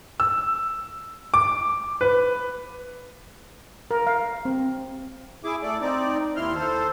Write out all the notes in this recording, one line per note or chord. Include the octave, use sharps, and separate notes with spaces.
E6
D6
B4
A#4
F5
C4
E4 G#4 D6
A3 A4 D5
C4 D#4 D5
D#2 E4 C6 F6
A4 C5